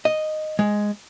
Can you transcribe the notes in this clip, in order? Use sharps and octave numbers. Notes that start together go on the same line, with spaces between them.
D#5
G#3